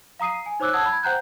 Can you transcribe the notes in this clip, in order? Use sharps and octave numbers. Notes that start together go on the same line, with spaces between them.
F5 A#5 D#6 C7 D#7
G#5
D#4 C5 C#5 D6 E6 F#6
F#5 A5 D#6 E6 F#6 G#6
B5 G#6
C5 F#5 G5 A#5 F#6 G6